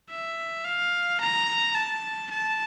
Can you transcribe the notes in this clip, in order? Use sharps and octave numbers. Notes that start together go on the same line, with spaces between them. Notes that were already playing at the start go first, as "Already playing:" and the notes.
E5
F5
A#5
A5
A5